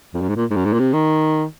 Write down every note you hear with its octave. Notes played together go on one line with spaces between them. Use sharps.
F2
F#2
G#2
A#2
G#2
F#2
G#2
A#2
C3
D#3